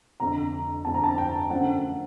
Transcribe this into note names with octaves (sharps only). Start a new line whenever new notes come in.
F1 F2 D3 A#5
F1 F2 D3 A5
A#5
A5
G5
F#2 D3 F3 A3 C4 F#5